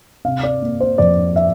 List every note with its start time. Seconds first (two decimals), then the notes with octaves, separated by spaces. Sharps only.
0.25 C3 F5
0.43 D5
0.62 A#3
0.81 C5
0.98 F2 D5
1.36 E5